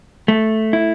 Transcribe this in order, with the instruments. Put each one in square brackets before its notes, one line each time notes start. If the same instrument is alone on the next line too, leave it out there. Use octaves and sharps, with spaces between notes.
[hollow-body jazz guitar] A3
E4